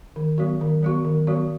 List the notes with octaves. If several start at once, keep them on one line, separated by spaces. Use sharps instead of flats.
D#3
F#3 B3 F#4
D#3
F#3 B3 F#4
D#3
F#3 B3 F#4